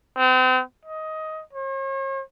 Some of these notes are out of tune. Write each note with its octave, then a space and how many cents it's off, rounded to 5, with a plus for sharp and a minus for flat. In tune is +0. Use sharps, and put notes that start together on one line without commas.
C4 -35
D#5 +15
C#5 -45